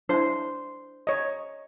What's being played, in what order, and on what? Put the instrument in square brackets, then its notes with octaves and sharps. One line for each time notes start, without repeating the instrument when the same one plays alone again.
[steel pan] D4 E4 [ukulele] C5
[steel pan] C#5 D#5